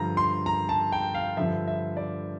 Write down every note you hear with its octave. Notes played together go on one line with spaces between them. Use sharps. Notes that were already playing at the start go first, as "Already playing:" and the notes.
Already playing: G2 D3 F3 A#5
C6
A#5
A5
G5
F5
G2 D3 F3 E5
E5
D5